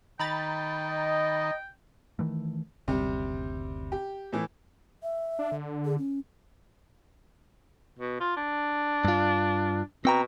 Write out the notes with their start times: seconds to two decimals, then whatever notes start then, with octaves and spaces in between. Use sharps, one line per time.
0.19 D#3 G5 A#5 B5 A6
0.87 D#5
2.19 D#3 E3 A3
2.88 F#1 D2 C3 G3
3.92 G4
4.33 A2 E3
5.03 E5
5.39 D4
5.52 D3
5.85 G#4
5.98 C#4
7.99 B2
8.20 F4
8.37 D4
9.05 G2 F4
10.05 B2 C4 G5 A#5